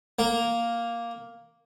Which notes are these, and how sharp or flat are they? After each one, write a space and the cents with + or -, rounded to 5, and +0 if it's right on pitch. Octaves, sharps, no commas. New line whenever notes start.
A#3 +0 A#4 +0